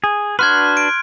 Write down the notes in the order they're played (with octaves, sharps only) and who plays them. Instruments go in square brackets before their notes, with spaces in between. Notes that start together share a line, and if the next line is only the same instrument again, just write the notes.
[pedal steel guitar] G#4
[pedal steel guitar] D4 F#4 B4 [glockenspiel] C6 F#6 G#6 [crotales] F6
[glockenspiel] D7